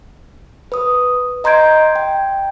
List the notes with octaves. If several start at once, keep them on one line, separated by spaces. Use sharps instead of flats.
B4 D#6
D#5 A#5 C6 G6 G#6 D7
G5